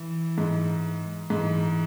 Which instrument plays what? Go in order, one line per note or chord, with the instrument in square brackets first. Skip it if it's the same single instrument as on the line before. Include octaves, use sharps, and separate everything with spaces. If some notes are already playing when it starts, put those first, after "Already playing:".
Already playing: [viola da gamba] E3
[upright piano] G#2
[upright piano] G#2 [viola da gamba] E3